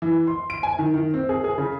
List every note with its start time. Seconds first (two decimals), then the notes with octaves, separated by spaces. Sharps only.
0.02 E3
0.27 C6
0.50 D7
0.63 G#5
0.79 D#3
0.94 D#3
1.14 C4
1.29 G#4
1.44 G#4
1.58 C#3